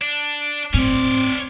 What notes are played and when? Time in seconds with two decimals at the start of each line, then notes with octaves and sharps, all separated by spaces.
0.01 D4
0.74 A2 C4 C#4 D5